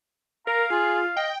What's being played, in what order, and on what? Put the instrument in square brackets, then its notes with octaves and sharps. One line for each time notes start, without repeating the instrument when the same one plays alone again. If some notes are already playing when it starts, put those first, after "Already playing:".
[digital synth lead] A#4 [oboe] F5 [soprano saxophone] A#5
[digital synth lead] F4 [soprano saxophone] G#4
[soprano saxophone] D#5 [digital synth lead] G5